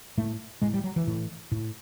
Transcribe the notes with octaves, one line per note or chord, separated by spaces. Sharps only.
A2 A3
A2 G#3
G3
F#3
E3
A2
A2